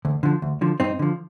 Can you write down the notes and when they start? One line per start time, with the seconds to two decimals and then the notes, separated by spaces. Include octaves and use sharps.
0.05 D2
0.23 D3 F3
0.42 D2
0.61 D3 F3
0.80 G2 C4 D#4
0.99 D3 F3